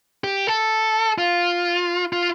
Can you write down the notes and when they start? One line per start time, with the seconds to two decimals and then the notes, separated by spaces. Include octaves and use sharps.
0.24 G4
0.47 A4
1.18 F4
2.13 F4